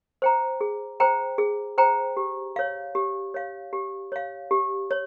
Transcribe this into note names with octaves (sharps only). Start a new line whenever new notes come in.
C5 G5 A#5
G#4
C5 G5 A#5
G#4
C5 G5 A#5
G4
C#5 F5
G4
C#5 F5
G4
C#5 F5
G4
C#5